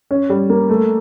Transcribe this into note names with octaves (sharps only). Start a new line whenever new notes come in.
C#4
G3
A#3
A3